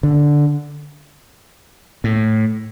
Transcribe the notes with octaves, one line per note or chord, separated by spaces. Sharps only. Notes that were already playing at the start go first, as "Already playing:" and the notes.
D3
A2